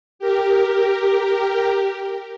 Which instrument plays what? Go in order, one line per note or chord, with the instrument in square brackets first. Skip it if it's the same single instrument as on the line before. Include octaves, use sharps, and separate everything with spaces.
[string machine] G4 A#4